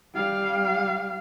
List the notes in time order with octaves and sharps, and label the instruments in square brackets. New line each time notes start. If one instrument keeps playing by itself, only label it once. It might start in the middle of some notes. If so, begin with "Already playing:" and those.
[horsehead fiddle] G3 F5